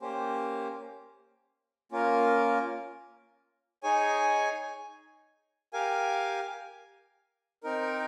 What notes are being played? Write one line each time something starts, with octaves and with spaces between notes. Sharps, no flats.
A#3 C#4 G4 C5
A#3 C#4 F4 A#4
D#4 G#4 C#5 G#5
G4 A#4 F5 G#5
C4 D#4 A#4